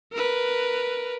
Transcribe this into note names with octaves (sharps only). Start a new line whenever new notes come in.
A#4 B4